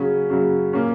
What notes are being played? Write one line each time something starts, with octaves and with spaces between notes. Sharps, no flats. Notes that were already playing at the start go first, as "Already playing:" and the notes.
Already playing: C#3 F#3 C#4
C#3 F#3 C#4
A#2 A#3 C#4